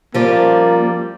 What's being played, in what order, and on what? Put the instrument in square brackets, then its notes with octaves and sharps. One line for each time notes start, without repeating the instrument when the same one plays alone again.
[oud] F3 G3 C#4 [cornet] A#3